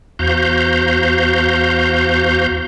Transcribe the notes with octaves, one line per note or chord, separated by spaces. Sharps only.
E2 F#4 C5 F5 A#5 G6